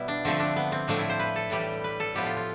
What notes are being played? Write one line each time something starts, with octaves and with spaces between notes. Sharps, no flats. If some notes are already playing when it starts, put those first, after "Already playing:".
Already playing: B2 G3 B3 E4
D4
D3 F3 A3 C4
D4
B3
C4
A2 F3 A3 D4
E4
C5
B4
A4
A2 E3 G3 G4
B4
A4
A2 F3 B3 G4
F4
F4